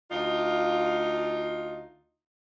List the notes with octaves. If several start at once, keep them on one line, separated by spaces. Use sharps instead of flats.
D2 D#4 F4